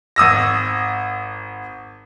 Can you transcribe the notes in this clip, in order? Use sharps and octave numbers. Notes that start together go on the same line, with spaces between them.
G#1 D#6 E6 A#6